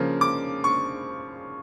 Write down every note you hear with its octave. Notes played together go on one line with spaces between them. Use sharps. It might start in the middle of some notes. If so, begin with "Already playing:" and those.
Already playing: C#3 F3 A#3
D6
C#6